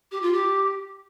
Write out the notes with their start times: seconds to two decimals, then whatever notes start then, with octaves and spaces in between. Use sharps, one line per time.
0.12 G4
0.22 F4
0.33 G4